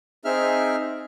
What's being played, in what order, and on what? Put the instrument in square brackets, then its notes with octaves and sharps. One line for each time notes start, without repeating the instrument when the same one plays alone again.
[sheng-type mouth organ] C4 D#4 G#4 E5 F6